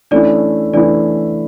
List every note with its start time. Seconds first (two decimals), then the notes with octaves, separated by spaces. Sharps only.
0.11 E3 A3 C#4 D4 E4 D5
0.73 E3 A3 C#4 D4 E4 D5